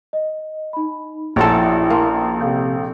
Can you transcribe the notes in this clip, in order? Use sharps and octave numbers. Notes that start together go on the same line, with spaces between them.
D#5
D#4 B5
A#1 C#4 E4 F#4 A4 A#5 C6
A#3 A5 C6
C3 A4 F5 G6